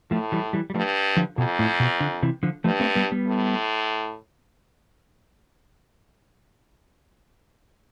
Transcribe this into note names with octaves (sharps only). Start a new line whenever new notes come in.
A2 F3 A3
E3 G3
E3 G3
G3
G2 F3 A3
D3 F3
F2 B2
A2
B2
D3
C3 E3
D3 F3
G2 F3 A3
A3 C4
G3 B3
G3 B3
A2